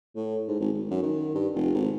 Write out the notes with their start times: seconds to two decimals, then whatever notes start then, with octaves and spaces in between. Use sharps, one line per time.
0.16 A2
0.48 G#2
0.60 G#1
0.73 G#1
0.91 F#2
1.02 D#3
1.35 G2
1.55 F1
1.75 G#1